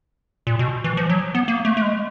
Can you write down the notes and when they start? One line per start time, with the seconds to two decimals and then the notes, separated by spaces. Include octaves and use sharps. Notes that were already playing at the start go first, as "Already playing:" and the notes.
0.47 A#2
0.59 B2
0.84 E3
0.97 F3
1.10 F#3
1.35 B3
1.48 A#3
1.65 A3
1.77 A3
1.81 G#3